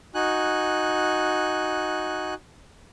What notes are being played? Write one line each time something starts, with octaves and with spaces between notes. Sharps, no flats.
D#4 F#4 G#5 F#6